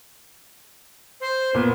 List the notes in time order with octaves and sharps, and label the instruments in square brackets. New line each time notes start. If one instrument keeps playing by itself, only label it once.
[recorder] C5
[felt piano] A#2 [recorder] B3